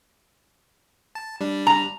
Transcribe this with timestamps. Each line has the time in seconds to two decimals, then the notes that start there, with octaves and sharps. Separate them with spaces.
1.15 A5
1.41 G3 D4
1.67 A#5